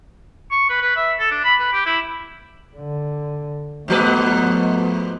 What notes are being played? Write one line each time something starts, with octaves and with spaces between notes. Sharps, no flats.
C#6
B4
B4
E5
A4
D4
B5
B4
G4
E4
D3
G#2 F3 A3 B3 B4